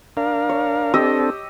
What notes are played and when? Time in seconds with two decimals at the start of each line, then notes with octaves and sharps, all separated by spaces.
0.17 D4 A#4 F5
0.49 C#5
0.94 C4 D4 G4 A4 D#5 E6